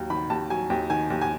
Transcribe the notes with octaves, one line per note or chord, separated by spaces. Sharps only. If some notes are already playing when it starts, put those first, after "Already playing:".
Already playing: D#2 F#3
D#3 B5
D#2 A5
F#3 G#5
D#2 G5
D#3 G#5
D#2
G#5